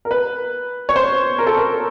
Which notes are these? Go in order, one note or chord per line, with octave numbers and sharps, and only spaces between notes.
A#4
B4
C#5
C5
A#4
A4
A#4